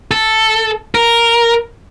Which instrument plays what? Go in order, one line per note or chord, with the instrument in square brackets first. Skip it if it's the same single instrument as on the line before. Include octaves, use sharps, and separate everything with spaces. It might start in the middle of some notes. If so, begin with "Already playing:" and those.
[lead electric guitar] A4
A#4